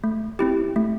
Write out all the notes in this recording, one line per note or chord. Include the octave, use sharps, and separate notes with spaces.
A3
C4 E4 G4
A3